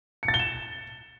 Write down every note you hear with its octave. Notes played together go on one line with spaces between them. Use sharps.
C#7
A6
G7
E7